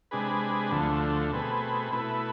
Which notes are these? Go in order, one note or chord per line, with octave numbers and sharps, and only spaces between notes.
C3 G#3 D4 G#4 B4
D2 D3 F3 A3
B2 A3 C4 G#4 B4
B2 A3 E4 B4